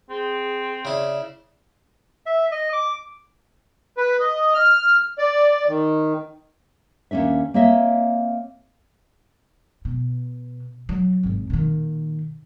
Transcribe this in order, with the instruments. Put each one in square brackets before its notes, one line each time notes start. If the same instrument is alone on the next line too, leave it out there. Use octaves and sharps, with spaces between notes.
[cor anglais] C4 [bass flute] G#4
[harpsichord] C#3 E4 [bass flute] D5
[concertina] E5
D#5
D6
[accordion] B4
D#5
F6
D5
D#3
[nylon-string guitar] D#2 C3 C#4 D4 E5
A#3 C4 C#5 D#5 E5
[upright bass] B2
F#3
G#1 G#2
A#2 D#3